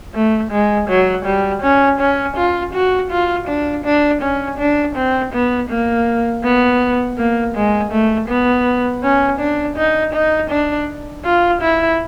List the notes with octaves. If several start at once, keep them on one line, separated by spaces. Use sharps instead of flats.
A3
G#3
F#3
G3
C#4
C#4
F4
F#4
F4
D4
D4
C#4
D4
C4
B3
A#3
B3
A#3
G#3
A3
B3
C#4
D4
D#4
D#4
D4
F4
E4